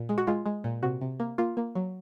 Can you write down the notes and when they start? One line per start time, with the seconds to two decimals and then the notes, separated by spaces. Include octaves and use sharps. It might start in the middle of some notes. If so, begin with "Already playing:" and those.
Already playing: A#2
0.09 G#3
0.18 F#4
0.27 G#3 F4
0.46 G#3
0.64 A#2
0.83 C3 F#4
1.01 C3
1.20 A#3
1.38 A#3 F4
1.57 A#3
1.75 F#3